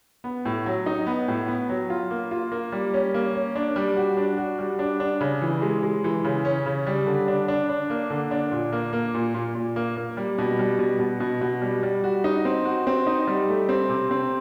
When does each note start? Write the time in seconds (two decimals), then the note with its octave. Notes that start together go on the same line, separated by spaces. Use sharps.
0.24 B3
0.45 A2
0.66 F#3
0.86 D#4
1.07 B3
1.28 A2
1.48 B3
1.69 F#3
1.90 F4
2.10 A#3
2.31 F4
2.52 A#3
2.72 G3
2.94 C#4
3.14 A#3
3.35 C#4
3.56 D4
3.76 G3
3.96 F#4
4.17 D4
4.38 F#4
4.59 G3
4.79 D4
5.00 D4
5.21 C#3
5.42 E3
5.62 G#3
5.83 G#3
6.04 E3
6.25 C#3
6.45 C#4
6.66 C#3
6.87 G3
7.07 D3
7.28 D4
7.48 D4
7.69 D4
7.90 A#3
8.10 D3
8.31 D4
8.51 A#2
8.73 A#3
8.93 A#3
9.15 A#2
9.34 A#2
9.55 A#2
9.76 A#3
9.97 A#3
10.17 G3
10.38 B2
10.59 G3
10.79 B2
10.99 B2
11.20 B2
11.41 B2
11.62 G3
11.83 G3
12.04 F#4
12.24 D#4
12.45 C4
12.65 F#4
12.87 C4
13.07 D#4
13.27 G3
13.49 A3
13.69 C4
13.89 C3
14.11 C4